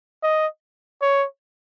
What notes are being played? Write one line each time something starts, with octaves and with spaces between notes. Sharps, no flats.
D#5
C#5